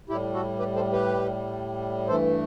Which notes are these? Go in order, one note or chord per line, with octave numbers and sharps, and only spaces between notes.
A2 G3 E4 G4
F#4 A4
G4 B4
A4 C5
G4 B4
G2 E3 A3 A4 C5